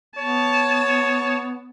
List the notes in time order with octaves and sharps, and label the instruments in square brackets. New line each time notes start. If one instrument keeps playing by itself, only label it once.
[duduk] B3 [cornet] C#5 [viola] A5